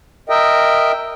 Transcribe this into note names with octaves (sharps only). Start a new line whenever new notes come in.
A#4 D#5 E5 G5